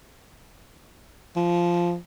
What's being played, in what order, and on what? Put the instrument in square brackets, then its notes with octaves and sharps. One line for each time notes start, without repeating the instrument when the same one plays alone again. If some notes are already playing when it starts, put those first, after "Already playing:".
[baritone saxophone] F3